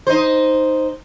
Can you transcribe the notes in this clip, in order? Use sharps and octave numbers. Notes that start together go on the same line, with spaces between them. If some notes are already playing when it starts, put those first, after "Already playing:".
D#4 C5